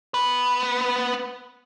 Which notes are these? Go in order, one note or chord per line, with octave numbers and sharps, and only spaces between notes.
B3 B4